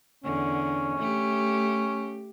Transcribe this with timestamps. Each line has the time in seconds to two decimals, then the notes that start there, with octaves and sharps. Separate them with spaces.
0.24 E2 D3 C#4
0.97 A3 G4